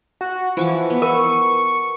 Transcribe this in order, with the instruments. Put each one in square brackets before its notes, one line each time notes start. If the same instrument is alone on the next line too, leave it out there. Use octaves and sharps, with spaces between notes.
[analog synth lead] F#4
[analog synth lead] E3 [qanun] F3 C#6 D6
[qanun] B3
[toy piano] A#4 [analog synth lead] C#6